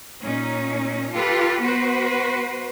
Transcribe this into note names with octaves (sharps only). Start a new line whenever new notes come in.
A#2 C#4 D#4
F4 G4 A4 B4
B3 F#4 B4 C5